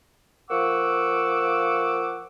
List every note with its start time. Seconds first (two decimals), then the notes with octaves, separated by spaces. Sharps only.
0.50 F3 A#3 F#5 C#6 D6 E6